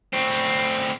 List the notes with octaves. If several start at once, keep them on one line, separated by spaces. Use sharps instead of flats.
A2 C4